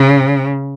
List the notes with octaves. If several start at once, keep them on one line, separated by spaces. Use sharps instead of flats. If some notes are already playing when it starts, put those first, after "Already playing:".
Already playing: C#3